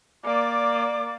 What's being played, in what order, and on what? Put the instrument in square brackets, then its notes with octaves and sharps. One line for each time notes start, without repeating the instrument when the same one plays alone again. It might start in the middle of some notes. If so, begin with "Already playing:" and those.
[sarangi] A#3 [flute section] D5 D6